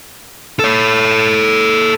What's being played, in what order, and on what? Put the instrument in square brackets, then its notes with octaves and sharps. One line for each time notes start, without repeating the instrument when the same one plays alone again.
[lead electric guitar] A4 C#5